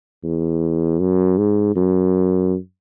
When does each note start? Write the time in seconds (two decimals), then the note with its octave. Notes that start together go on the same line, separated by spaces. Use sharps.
0.24 E2
1.00 F#2
1.38 G#2
1.76 F#2